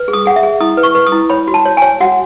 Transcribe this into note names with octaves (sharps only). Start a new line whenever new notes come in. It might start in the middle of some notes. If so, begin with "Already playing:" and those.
Already playing: B4
G#4
D#6
G#4 F#5
E5
G#4
E4 D#6
B4
C#6
B4
D#6
E4
C#5 B5
F#4
A5
C#5
C#5 G#5
F#4 F#5